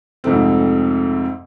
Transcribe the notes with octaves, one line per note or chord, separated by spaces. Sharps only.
F2 G#2 C3 A3 C4